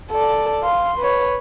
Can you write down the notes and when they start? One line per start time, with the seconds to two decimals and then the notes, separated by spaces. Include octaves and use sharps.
0.11 A4 D5
0.63 F5 C6
0.98 B4 C#5